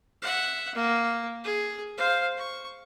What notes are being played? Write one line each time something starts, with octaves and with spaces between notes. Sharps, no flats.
E5 F#5
A#3
G#4
C5 F5
C#6